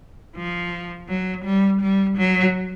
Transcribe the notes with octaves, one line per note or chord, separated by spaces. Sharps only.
F3
F#3
G3
G3
F#3